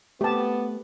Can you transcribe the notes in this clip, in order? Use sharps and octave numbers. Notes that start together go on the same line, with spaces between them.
A3 B3 G4 A5